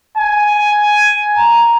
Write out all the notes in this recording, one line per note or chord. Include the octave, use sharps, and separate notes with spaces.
G#5
A#5